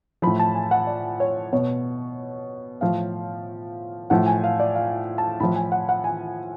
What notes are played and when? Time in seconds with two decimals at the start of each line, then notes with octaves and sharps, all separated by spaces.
0.22 A2 F3 B5
0.39 A5
0.55 G#5
0.71 F#5
0.87 D5
1.20 C#5
1.53 B2 C#5
2.81 A2 F3 F5
4.10 A2 F3 F#5
4.26 G#5
4.44 F5
4.59 D5
4.75 F5
5.18 A5
5.40 A2 F3 B5
5.56 G#5
5.72 F#5
5.89 F#5
6.04 G#5